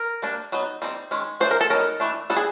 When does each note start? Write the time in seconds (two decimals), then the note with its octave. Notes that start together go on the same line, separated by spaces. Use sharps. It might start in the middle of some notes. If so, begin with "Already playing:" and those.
Already playing: A#4
0.22 G3 A#3 D4
0.52 F#3 B3 D#4
0.82 G3 C4 D#4
1.11 D#3 G#3 C#4
1.40 F#3 A3 D4 C5
1.51 A#4
1.61 A4
1.70 F#3 B3 D#4 A#4
2.00 E3 A3 D4
2.30 G3 B3 D4 A4
2.36 G#4